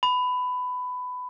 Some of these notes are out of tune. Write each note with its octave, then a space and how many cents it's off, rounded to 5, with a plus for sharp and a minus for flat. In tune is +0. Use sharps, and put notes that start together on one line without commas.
B5 +20